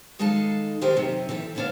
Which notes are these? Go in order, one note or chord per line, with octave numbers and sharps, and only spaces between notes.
D#3 G#3 D#4 A4 F5 A5
D#3 D4 G4 A#4 C5 G#5
F#2 C3 D#3
E3 G4 A4 E5
D2 G#2 B3 D4 C#5 F5